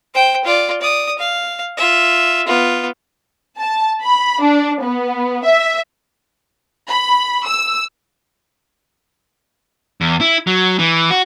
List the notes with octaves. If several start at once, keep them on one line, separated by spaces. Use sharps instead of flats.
C5 G5
F4 D5
D5 D#6
F5
F4 E5
B3 F4
A5
B5
D4
B3
E5
B5
E6
E2
E4
F#3
E3
F#4